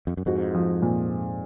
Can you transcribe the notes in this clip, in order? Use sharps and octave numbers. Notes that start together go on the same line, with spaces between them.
F2
F#2
F2 G#2 F#4
F3
A#2